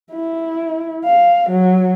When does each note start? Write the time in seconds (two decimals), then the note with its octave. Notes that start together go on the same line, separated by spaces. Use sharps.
0.13 E4
1.05 F5
1.50 F#3